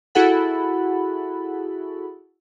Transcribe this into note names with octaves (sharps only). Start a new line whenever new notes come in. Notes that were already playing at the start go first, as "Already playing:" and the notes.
E4 F#4 G#4 A4 F#5 B5